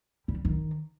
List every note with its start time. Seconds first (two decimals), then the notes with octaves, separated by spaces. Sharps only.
0.28 G3
0.45 D#3